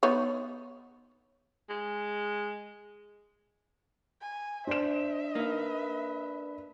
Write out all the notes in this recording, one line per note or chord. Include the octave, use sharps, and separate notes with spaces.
B3 D#4 C#5
G#3
G#5
D4 C5 E5 E7
A#3 D#4 B4